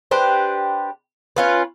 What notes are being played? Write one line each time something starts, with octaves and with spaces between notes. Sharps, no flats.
D4 G4 B4 C5
C#4 F4 B4